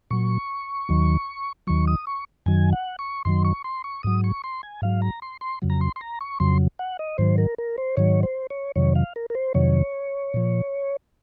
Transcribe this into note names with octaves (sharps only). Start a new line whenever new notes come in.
A#2 F#3 C#6
D#2 D#3 F#3
D#2 D#3 F#3 C#6
D#6
C#6
F#2 D#3 F#3 G#5
F#5
C#6
F#2 D#3 F#3 C6
C#6
C6
C#6
G#2 F#3 D#6
C#6
C6
G#5
G#2 F#3 F5
A#5
C6
C6
F2 C#3 F#3
A#5
C6
C6
A#5
C#6
F2 C#3 F#3 C6
F#5
D#5
G#2 D#3 F#3 C5
A#4
A#4
C5
G#2 D#3 F#3 C#5
C5
C#5
F2 C3 D#3 F#3 C#5
F5
A#4
A#4
C5
F2 C3 D#3 F#3 C#5
A#2 F3